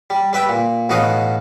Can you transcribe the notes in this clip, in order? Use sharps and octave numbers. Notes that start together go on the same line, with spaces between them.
G3
G3 B4 E5 G5
A#2
A1 B2 D#4 F5 F#5 D#6